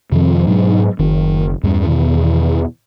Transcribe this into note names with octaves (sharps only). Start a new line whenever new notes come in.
F2 C3 D#3 F3
G#2 B2 F#3 D4
F#1 D#3
E2 G2 G3 C#4
B2 D#3